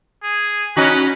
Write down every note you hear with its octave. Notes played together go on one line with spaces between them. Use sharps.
G#4
C#4 D#4 F#4 B4